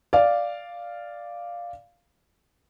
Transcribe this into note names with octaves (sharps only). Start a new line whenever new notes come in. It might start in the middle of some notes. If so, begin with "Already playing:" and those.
D5 F5